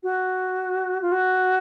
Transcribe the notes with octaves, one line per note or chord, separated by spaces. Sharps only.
F#4
F4
F#4